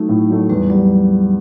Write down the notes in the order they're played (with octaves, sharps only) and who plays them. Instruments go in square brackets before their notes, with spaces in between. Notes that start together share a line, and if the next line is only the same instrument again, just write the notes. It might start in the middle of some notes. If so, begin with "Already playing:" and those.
Already playing: [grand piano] F#3 A3 [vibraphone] D#4
[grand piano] A2
F#3 A3
[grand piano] E2 [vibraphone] G3
[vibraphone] F#3 [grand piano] G3